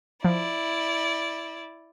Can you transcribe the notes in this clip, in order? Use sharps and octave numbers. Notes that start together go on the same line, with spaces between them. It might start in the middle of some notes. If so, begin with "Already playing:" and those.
F3 E4 D5